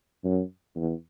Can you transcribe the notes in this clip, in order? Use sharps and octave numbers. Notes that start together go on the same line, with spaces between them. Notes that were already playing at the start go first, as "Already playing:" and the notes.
F#2
E2